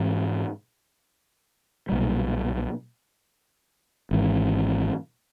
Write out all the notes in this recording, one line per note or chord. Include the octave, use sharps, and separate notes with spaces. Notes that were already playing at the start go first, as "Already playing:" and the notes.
Already playing: G#2 E3 G#3 C4
B1 A#2 G3
G#1 G#2 E3